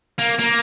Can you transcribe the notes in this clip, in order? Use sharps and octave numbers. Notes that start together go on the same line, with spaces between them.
A#3
A#3